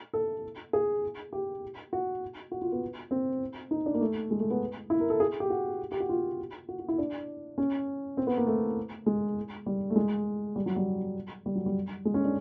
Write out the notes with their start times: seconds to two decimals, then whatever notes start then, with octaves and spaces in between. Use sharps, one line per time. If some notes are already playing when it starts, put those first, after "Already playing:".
0.13 A4
0.73 G#4
1.33 G4
1.93 F#4
2.52 F#4
2.62 F4
2.72 B3
3.11 C4
3.71 D#4
3.86 D4
3.94 A#3
4.01 A3
4.31 G#3
4.40 A3
4.51 B3
4.90 E4
5.00 A#4
5.10 A4
5.20 G#4
5.40 G4
5.50 F#4
5.92 G4
6.00 F#4
6.09 F4
6.69 F#4
6.79 F#4
6.88 E4
6.98 D4
7.58 C#4
8.17 C4
8.27 B3
8.37 A#3
8.47 A3
9.06 G#3
9.66 G3
9.90 A3
9.96 G#3
10.56 G3
10.66 F#3
10.76 G3
11.46 G3
11.55 F#3
11.66 G3
12.05 G#3
12.14 C#4
12.25 D4